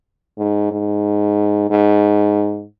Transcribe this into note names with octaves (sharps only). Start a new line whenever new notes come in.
G#2
G#2
G#2